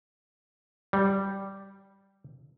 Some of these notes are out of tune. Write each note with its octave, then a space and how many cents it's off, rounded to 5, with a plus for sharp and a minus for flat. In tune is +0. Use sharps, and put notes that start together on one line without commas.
G3 -5